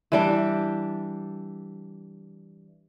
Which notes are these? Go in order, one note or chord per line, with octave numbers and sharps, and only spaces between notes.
E3 G3 D4